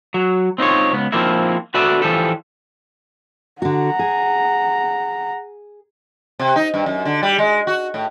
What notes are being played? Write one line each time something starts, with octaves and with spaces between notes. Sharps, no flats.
F#3
C4 D#4 F4 C#5
C#2 B3
F3 A#3 C4 D#4 E4
F#4 A4 B4 D5 E5
E3 F3 G3 G4 A4
D3 F#4 F#5 A#5
G#4
C3
D#4
G2
F#2
D3
G3
G#3
F#4
A2